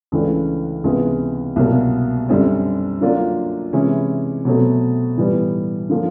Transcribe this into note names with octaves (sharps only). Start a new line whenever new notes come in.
C#2 C#3 E3 A3 D4
C#2 C3 E3 G#3 B3
C2 B2 F#3 A#3
F#2 D3 G3 C4
D3 F#3 A#3 D4 F4
C3 E3 G#3 C#4 E4
B2 F#3 A3 C4
A2 E3 G3 B3
D3 F3 A#3 C#4